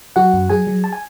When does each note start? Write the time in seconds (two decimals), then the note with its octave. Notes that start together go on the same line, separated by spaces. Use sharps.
0.16 F#3 F#4 F#5
0.34 F#2
0.49 F#3 G#4 G#5
0.67 F#3
0.84 A5
0.93 G#5